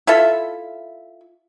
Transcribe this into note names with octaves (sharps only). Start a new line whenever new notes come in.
E4 F4 A4 E5